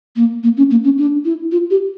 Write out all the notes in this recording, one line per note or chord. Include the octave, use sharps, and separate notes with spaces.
A#3
A#3
C#4
A#3
C#4
D4
E4
F4
G4